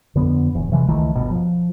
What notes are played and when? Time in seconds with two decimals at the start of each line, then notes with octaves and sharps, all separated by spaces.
0.15 F2 D3 B3
0.54 D1 E2
0.72 C3 E3 G#3
0.88 C#2 D#3 E3 A3
1.15 G1 B2
1.30 F3